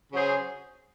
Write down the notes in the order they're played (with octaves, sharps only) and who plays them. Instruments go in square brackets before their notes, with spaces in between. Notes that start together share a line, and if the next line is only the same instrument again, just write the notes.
[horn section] C#3 F#3 C#4 G#4 C5